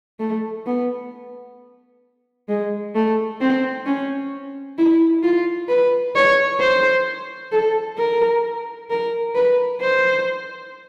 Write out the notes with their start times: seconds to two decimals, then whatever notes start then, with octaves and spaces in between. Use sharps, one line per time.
0.20 A3
0.66 B3
2.49 G#3
2.95 A3
3.41 C4
3.86 C#4
4.78 E4
5.23 F4
5.69 B4
6.16 C#5
6.60 C5
7.52 A4
7.98 A#4
8.90 A#4
9.35 B4
9.81 C5